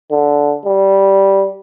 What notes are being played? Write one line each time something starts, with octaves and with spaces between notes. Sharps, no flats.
D3
G3